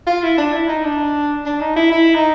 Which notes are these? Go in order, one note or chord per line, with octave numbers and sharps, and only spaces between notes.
F4
E4
D4
E4
D#4
D4
D4
D#4
E4
E4
D#4